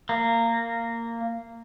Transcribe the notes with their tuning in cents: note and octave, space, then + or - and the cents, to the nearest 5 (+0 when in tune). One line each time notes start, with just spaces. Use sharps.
A#3 -15